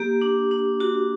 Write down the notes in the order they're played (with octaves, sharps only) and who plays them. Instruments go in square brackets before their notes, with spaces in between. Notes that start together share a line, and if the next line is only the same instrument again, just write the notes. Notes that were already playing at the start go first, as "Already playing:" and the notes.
Already playing: [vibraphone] A#3 G4
D4
D4
D4 F#4